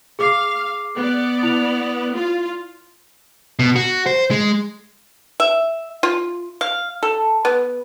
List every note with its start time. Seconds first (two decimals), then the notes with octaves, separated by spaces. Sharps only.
0.19 G#4 F5 D6 C7
0.96 B3 D5
1.43 E4 F7
2.15 F4
3.59 B2
3.76 F#4
4.06 C5
4.31 G#3
5.40 E5
6.03 F4
6.61 F5
7.03 A4
7.45 B3